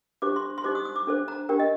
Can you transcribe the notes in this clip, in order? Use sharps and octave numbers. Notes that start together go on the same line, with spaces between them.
D4 G4 C5 D6
C6
C6
D#4 G4 C5 D6
D#6
D#6
D6
D4 A4 C5
A#5
D4 G4 A#4 G5
D#5